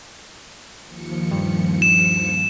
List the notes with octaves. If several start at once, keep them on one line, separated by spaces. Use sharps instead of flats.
D#2 F3 C#7
G2
E7